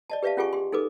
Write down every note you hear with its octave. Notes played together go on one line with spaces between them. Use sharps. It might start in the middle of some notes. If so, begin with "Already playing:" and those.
D5 D#5 A5
G4 B4 D5 E5 F5 A5
C#4 F4 G4 G#4 G#5 C#6
G4 C6
D#4 G#4 A4 B4 D6